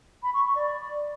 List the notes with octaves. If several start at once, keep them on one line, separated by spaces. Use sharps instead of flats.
B5
C#6
C#6
D5